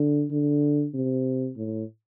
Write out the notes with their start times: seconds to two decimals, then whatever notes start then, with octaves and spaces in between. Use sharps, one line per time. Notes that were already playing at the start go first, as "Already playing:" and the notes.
Already playing: D3
0.30 D3
0.94 C3
1.56 A2